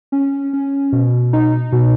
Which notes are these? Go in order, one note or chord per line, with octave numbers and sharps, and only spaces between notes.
C#4
C#4
B2
D#4
B2